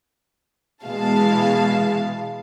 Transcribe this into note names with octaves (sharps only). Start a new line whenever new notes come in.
B2 E3 G#3 F5 A5